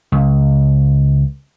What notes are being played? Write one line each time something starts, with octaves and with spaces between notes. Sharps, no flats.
C#2